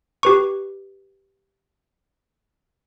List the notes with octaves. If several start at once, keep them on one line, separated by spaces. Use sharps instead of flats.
G4 B4 C#6